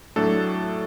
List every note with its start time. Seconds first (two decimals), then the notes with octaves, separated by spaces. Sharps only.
0.16 A2 F#3 A3 D4 A4